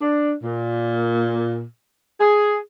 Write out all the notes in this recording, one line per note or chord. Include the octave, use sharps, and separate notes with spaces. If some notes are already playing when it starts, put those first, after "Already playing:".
D4
A#2
G#4